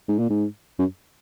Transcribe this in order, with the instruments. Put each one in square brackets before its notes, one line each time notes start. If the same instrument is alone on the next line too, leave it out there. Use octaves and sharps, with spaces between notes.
[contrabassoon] G#2
A#2
G#2
F#2